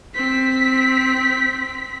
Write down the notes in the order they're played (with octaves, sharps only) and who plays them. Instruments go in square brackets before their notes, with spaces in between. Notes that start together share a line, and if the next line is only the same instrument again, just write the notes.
[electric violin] C4 B6